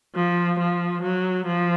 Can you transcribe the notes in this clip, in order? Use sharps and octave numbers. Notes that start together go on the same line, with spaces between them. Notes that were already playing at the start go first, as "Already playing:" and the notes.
F3
F3
F#3
F3